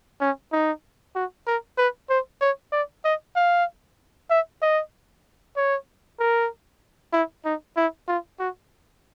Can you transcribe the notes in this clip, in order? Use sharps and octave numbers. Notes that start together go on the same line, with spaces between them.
C#4
D#4
F#4
A#4
B4
C5
C#5
D5
D#5
F5
E5
D#5
C#5
A#4
E4
D#4
E4
F4
F#4